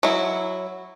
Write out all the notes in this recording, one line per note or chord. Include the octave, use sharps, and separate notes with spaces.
F#3 E4